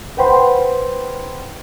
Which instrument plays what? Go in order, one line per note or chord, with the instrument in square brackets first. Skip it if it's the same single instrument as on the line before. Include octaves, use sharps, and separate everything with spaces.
[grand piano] B4 C5 F#5 G5 B5 C6